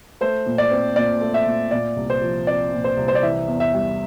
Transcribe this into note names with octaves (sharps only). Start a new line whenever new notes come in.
A3 C5
A#2
D5
C4
A#2 D5
A3
E5
A#2
A#2 D5
C2
C5
F3
C4 D5
A#2
C5
C2
C5
D5
E3 E5
E2
E5
G3